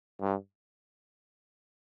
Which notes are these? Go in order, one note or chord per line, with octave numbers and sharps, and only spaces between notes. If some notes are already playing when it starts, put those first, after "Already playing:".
G2